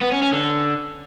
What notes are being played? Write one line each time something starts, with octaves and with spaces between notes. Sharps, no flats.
B3
C#4
C#4
D3